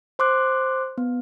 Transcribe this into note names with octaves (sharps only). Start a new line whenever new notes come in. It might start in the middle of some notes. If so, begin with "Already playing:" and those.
C5 C6 D6 F#6
B3